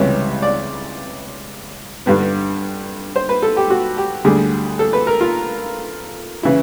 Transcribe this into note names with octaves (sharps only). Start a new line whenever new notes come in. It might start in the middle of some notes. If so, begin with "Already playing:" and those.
Already playing: C#2 C3 E3 G3 C#5
D5
G2 D3 G3 B3
C5
B4
A4
G4
F#4
G4
D2 D3 G3 G#4
A4
B4
A#4
F4
C#3 E3 E4